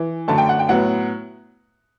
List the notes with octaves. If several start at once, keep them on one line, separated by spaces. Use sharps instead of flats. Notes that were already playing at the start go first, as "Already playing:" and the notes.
Already playing: E3
F#2 D3 A3 A5
G5
F#5
G5
A2 F#3 B3 F#5